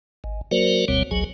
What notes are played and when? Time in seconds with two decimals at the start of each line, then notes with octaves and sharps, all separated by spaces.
0.24 G#1
0.51 F#3 A#3 F#4 A#4 C5 D5
0.88 F#1 D2 B2 G3 C4 C#5
1.11 G#1 C#2 F#3 G#4